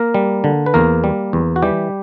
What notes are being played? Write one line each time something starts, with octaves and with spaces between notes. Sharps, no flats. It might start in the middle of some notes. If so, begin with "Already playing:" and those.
Already playing: A#3 A#4
G3
D3
B4
E2 A#3 A#4
G3
E2
F#4
E3 G3 G4